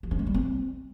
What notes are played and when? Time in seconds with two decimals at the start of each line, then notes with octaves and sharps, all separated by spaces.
0.03 F3
0.11 C#4
0.19 G#3
0.27 G3
0.34 C4